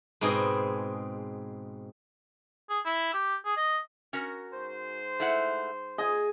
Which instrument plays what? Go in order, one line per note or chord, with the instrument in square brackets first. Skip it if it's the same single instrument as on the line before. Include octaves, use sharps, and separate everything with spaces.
[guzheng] G#2 B2 G#3 C4 G#4
[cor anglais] G#4
E4
G4
G#4
D#5
[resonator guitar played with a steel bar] C#4 F#4 A#4
[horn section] G#2 C5
[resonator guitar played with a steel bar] A3 E4 F#5
[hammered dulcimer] G#4 G#5 [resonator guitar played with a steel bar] D#5